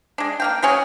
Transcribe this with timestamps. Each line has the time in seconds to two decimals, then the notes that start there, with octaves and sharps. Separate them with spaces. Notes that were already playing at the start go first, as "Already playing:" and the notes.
0.18 G#3 D4
0.40 A#3 F5 G5
0.62 F#3 G#3 C#4 G#4